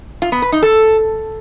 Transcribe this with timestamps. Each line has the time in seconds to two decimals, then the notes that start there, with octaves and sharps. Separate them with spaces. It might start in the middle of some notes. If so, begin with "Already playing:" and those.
0.22 F4
0.32 B3
0.42 B4
0.52 D#4
0.63 A4